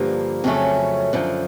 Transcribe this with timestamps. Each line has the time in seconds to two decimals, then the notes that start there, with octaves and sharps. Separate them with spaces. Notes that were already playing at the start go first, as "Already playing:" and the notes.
Already playing: G2 D3 F3 A#3
0.44 F2 C#3 F#3 A3 C#4
1.13 F#2 D3 F3